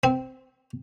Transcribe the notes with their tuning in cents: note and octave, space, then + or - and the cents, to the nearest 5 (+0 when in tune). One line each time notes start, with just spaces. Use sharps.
C4 -10